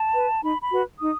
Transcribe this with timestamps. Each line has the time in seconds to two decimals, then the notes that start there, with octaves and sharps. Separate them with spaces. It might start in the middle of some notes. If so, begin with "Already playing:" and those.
Already playing: A5
0.16 B4
0.43 D#4 B5
0.63 B5
0.71 F#4 B4
0.99 D#4 D#6